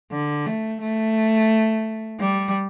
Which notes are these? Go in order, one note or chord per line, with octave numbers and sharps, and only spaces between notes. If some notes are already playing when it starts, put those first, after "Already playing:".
D3
A3
A3
G3